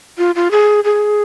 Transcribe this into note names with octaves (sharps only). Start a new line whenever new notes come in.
F4
F4
G#4
G#4